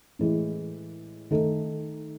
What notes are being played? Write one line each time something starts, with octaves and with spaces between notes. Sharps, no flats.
A2 E3 G#3
D#3 A3 D#4 A4